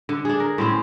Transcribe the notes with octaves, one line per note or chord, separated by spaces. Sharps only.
D3
D4 G#4
A#4
A2 C4 C#4